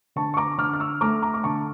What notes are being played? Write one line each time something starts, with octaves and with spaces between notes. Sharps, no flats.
D3 A5 C#6
C#6
A#5 D6
D3 D6 F6
F6
C#6 E6
A3 A#5 D6
A#5 D6
D6
D3 A5 C#6